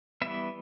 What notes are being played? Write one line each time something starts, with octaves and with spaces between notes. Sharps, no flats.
E3 G3 B3 E5